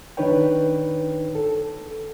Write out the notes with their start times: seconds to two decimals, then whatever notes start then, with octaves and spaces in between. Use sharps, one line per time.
0.17 D#3 D4 D#4 B4 C#5 G5
1.35 A4